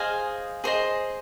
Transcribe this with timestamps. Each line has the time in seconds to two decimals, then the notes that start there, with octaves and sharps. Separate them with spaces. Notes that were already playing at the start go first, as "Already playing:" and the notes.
Already playing: G#4 C5 D#5 F5 G#5
0.64 G#4 C5 D#5